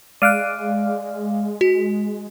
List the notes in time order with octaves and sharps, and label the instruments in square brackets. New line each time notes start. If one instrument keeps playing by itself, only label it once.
[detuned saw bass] G#3 [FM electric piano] D5 F5 [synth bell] F#6 D7 D#7
[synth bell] F#4